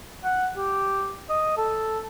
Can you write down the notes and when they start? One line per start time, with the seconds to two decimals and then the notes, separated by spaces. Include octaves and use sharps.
0.24 F#5
0.57 G4
1.30 D#5
1.58 A4